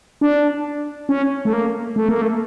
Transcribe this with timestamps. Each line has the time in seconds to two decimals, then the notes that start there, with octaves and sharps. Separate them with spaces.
0.21 D4
1.09 C#4
1.45 A3
1.53 A#3
1.96 A3
2.09 A#3
2.22 A3